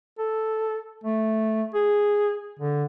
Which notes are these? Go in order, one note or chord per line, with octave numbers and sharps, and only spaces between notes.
A4
A3
G#4
D3